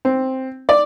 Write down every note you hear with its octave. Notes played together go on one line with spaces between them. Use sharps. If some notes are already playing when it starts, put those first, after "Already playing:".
C4
D5